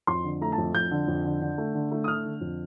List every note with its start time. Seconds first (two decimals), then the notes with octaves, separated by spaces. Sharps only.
0.07 F2 C6
0.24 D3
0.41 A3 A#5
0.52 A5
0.58 F2
0.74 F2 G6
0.91 D3
1.08 F2
1.25 D3
1.42 D3
1.58 A3
1.75 D3
1.91 A3
2.04 D#6
2.08 D3 F6
2.25 D3
2.41 F2